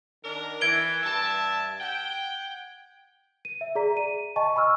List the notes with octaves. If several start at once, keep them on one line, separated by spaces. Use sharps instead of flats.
D#3 D4 A#4
E3 G#6 D7 G7
G2 E5 A5
F#5 G5
D#7
E5
G#4 D5 A#5 B6
D#7
D#5 G#5 A5 C#6
G#5 B5 C#6 E6 F6